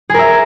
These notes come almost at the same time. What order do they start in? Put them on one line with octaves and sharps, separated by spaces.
G#4 A#4 E5